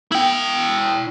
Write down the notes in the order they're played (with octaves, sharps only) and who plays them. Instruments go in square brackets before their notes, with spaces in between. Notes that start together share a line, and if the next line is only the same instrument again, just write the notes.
[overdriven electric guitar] E4 G5